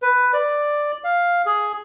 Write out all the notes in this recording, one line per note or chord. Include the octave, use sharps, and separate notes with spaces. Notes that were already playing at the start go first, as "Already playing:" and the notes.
B4
D5
F5
G#4